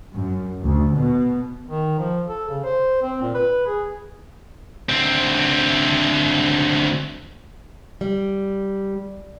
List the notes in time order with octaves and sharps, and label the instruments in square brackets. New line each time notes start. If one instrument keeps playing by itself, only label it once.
[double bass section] F#2
D2
B2
[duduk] D#3
F3
A4
C#3
C5
C4
A#2
B4
G#4
[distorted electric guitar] D2 C4
[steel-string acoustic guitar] G3